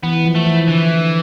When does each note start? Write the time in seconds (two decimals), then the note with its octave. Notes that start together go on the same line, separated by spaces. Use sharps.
0.03 E3 B3
0.25 F3
0.35 A3
0.46 E3
0.68 D3 E3